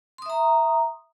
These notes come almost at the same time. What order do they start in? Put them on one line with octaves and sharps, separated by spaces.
C6 D#6 E5 A#5